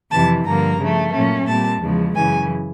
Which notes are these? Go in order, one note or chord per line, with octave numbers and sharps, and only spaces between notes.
F2 C3 E3 A5
G2 D3 F3 A#3 A#5
C#3 F3 A3
A#2 F#3 A3 C#4
A#2 G3 C4 A5
E2 C#3 F3 G#3
F#2 C#3 E3 G#5